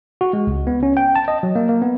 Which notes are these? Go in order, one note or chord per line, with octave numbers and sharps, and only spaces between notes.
F#4
G#3
C#2
B3
C#4
G5
A5
D#5
F#3
A#3
A#3
B3